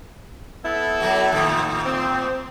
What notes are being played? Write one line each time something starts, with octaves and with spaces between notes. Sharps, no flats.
B3 E4 A4
F#3 A3 F#4
A2 D#3 F3
C4